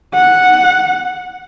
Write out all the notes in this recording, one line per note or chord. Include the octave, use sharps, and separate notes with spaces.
F#5